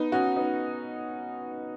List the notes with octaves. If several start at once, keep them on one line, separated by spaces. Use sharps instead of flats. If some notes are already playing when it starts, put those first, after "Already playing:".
Already playing: B3 D#4
C#4 F#4
B3 D#4